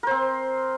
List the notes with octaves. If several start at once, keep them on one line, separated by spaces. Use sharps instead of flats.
C4 A#4 C5